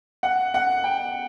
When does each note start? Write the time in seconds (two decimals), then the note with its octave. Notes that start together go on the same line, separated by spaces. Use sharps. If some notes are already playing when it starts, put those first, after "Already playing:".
0.23 F#5
0.54 F#5
0.84 G5